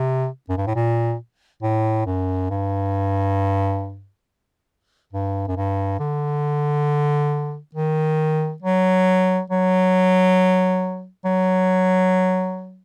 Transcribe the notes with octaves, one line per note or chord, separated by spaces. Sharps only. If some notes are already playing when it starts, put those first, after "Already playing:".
Already playing: C3
F#2
G2
A2
A#2
A2
F#2
G2
G2
F#2
G2
D3
D#3
F#3
F#3
F#3